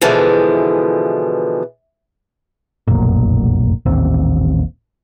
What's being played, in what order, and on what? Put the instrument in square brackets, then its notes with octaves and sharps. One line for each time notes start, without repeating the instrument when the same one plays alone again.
[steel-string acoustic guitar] B2 D3 E3 F3 G#3
[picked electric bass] F1 B1 F#2 A#2
D#1 A1 D#2 C4